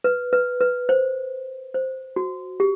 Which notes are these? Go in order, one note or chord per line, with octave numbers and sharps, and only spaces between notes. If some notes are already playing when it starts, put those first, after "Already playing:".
B4
B4
B4
C5
C5
F#4
G4